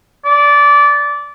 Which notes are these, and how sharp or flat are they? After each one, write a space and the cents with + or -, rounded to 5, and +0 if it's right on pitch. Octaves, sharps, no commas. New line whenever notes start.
D5 -20